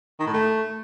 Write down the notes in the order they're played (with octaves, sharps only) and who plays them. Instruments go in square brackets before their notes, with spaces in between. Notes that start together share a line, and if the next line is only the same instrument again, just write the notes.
[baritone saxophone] D#3
A2
A3